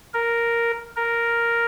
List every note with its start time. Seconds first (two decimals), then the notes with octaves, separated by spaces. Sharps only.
0.14 A#4
0.96 A#4